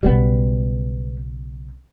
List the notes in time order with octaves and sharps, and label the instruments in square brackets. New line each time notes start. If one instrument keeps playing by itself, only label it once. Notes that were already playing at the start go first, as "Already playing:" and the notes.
[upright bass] B1 C#3 [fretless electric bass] G3 A#3 B3